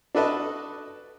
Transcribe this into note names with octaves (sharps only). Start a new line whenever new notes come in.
D4 F#4 A4 B4 D#5 A5